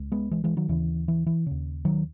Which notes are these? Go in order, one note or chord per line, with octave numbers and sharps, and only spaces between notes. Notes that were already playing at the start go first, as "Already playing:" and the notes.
Already playing: C#2
G#3 B3
E3 G#3
E3 G#3
D#3 F#3
D#2 C#3 E3
E3
E3
D#2 C#3
D#3 F#3